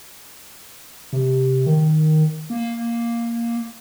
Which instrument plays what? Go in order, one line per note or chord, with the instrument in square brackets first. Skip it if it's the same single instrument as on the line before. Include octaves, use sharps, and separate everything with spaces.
[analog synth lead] C3
D#3
[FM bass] A#3